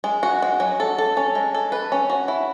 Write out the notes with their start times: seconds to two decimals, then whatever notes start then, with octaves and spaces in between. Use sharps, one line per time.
0.04 G#3
0.23 F#4
0.42 G#3
0.60 F#3
0.80 A4
0.98 A4
1.17 C#4
1.35 G#3
1.54 A4
1.72 B4
1.92 C#4
2.10 F#4
2.28 E4